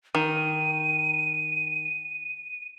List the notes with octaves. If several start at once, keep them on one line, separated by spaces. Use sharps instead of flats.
D#3 D#7